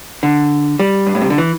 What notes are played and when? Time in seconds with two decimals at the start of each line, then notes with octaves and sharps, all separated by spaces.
0.23 D3
0.79 G3
1.06 G2
1.15 A2
1.22 C3
1.30 D3
1.38 E3